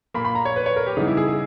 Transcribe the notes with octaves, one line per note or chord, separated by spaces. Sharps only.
A#2 A#3 B5
B5
A#5
C#5
B4
C#5
A#4
G4
C#3 E3 G3 B3 D#4
E4
G#4
G#4